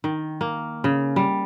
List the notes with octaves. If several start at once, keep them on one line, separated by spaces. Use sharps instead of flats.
D#3
A#3
C#3
G3